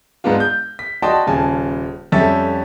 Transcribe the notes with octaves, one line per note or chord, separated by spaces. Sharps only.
G#2 G#3 B3 D4 F4
G6
B6
F#4 D5 D#5 G5 A5 C6
D#1 C#3 G#5 A5
F2 G3 C#4 A4 E5 A6